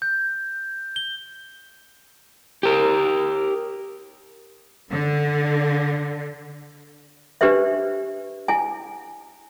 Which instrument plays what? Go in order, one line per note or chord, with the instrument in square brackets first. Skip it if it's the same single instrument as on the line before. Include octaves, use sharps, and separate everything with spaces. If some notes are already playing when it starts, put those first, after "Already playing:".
[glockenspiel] G6
G7
[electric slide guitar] G4 A#4
[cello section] D3
[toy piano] D4 G4 B4 C5 E5
E4 G#5